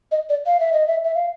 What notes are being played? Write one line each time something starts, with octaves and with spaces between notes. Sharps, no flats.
D#5
D5
F5
E5
D#5
E5
E5
F5